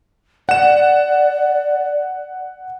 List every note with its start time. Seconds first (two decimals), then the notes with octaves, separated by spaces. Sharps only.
0.49 D5 F#5 E7